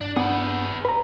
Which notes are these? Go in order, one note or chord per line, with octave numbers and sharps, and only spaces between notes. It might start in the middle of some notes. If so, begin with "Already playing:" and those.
G2 D4
B3 D4 G#4 B4 F#5
B4 A#5